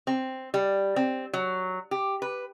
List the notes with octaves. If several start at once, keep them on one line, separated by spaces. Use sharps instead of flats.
C4
G3
C4
F#3
G4
B4